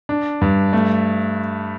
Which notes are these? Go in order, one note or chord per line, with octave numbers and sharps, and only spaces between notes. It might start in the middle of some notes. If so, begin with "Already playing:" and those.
D4
G2
A3